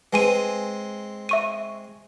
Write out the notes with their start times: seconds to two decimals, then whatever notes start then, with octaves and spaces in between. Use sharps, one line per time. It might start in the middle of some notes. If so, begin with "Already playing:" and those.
0.13 G#3 C4 B4 G#5 D#7
1.29 E5 C#6 D#7